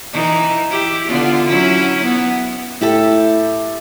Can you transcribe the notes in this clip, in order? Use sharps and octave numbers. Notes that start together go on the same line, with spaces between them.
E3 D#4
E4 G4
D3 B3 F4
F#3 C#4 E4
B3
A2 E4 G4 A4